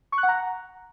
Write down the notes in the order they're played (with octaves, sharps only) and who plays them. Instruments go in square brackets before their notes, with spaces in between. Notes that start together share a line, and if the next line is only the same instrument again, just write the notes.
[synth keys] C#6
F#6
F#5
A#5